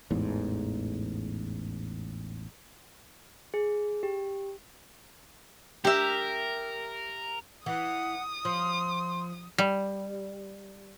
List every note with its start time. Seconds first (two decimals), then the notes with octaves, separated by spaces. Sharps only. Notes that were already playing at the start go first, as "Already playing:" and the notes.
0.10 A1 E2 G#2
3.54 G#4
4.03 G4
5.85 G4 A#4 E5
7.66 E3 F#5 D#6
8.45 F3 C6
9.58 G3